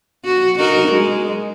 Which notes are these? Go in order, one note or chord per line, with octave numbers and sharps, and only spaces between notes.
F#4
D#4 F#4 A#4
G#3